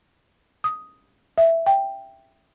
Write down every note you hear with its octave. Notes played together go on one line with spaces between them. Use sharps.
D#6
E5
G5